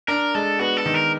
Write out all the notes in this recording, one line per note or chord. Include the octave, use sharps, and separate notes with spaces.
D4 A#4
G#3 A4
B3 F#4
A4
D#3
A#4